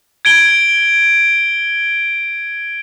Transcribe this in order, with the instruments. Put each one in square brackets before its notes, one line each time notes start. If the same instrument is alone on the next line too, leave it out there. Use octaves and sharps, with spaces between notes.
[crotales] G#6 D7 G7